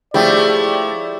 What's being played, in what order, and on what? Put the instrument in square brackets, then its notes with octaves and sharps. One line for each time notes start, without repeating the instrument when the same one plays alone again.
[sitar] F3 A3 [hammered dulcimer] E4 G4 C#5 [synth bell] G#4 [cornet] D5